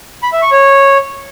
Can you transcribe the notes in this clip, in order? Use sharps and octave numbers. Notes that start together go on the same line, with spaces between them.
B5
E5
C#6
C#5